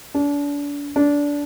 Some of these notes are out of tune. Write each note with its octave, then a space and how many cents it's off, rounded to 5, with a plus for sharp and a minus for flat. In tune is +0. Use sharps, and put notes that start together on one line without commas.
D4 -35
D4 -20